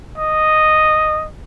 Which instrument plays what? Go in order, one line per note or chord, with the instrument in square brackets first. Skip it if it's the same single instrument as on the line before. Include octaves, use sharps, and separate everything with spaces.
[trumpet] D#5